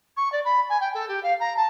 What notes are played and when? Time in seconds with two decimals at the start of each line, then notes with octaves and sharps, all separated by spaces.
0.16 C#6
0.32 D5
0.44 B5
0.69 G#5
0.80 G5
0.94 A4
1.08 G4
1.23 F5
1.40 A#5
1.56 A5